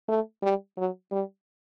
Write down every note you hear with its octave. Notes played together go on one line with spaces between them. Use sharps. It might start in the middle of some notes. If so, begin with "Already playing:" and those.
A3
G3
F#3
G3